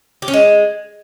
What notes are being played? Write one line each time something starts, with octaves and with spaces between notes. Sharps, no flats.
G4
C#4
G#3